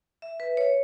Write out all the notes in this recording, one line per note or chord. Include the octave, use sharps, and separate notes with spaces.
E5
B4
C#5